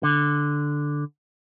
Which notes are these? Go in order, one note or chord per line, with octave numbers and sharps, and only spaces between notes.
D3